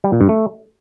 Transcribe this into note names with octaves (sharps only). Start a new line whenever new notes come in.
G3
A#2
G2
A3